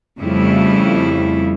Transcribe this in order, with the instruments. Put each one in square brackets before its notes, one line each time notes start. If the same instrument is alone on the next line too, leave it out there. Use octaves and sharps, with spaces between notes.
[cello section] F2 C#3 F3 G3 A3 E4